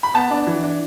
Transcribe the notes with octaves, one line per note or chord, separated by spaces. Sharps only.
B5
B3 A5
D4
E3
D4